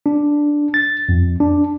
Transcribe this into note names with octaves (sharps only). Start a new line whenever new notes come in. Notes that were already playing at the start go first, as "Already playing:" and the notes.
D4
A6
F2
D4